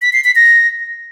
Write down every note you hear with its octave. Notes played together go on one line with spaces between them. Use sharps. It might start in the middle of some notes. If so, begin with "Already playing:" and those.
B6
C7
B6
A#6